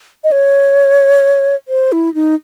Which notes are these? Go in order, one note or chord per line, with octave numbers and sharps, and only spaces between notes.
D#5
C#5
C5
E4
D#4